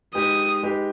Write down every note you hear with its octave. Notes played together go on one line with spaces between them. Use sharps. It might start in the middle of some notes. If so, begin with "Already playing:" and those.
G#3 D#4 G4 B4 D#6
G#3 D#4 G4 B4